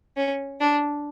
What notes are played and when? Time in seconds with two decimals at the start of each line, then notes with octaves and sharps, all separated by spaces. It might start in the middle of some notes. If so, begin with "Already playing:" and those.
0.17 C#4
0.60 D4